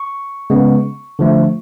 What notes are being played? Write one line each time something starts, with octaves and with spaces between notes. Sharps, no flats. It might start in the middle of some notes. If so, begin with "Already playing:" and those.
Already playing: C#6
C#3 G#3 B3
D3 F3 A3